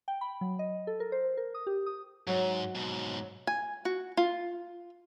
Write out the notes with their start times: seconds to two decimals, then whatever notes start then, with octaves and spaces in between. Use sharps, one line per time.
0.08 G5
0.21 B5
0.41 F#3
0.59 D#5
0.87 A4
1.00 A#4
1.12 C5
1.37 A#4
1.55 D#6
1.67 G4
1.86 D#6
2.27 G#2 F#3
2.75 G#2 B2
3.47 G#5
3.85 F#4
4.17 F4